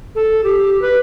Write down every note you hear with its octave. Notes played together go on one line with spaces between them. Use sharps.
A4
G4
B4